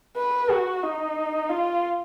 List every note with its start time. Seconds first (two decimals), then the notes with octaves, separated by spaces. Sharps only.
0.17 B4
0.51 F#4
0.84 D#4
1.50 F4